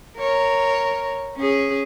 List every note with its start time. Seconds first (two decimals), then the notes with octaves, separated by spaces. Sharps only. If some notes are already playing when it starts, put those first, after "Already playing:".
0.18 A#4 C#5
1.36 C#4 G#4